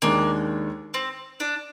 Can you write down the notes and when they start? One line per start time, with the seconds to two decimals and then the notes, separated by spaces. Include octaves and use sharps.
0.02 D#2 D#3 G#3 A#3 D4
0.94 C4
1.40 D4